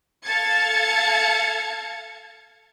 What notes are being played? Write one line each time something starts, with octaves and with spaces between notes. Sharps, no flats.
A4 F5 A5 G#6 A6 C#7